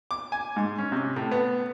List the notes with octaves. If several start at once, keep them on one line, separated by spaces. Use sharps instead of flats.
D6
G#5
G#2
C#4
C3
A2
B3